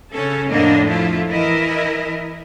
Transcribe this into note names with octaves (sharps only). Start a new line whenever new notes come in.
C#3 C#4 A4
F2 A2 D3 A#3 D4 D#5
F3 A3 E4 F4
E3 E4 A#4 D#5